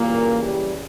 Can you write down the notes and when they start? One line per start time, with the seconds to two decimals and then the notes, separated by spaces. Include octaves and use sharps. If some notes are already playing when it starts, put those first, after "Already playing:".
Already playing: A#2 C#3 E3 G3 A#3
0.42 G3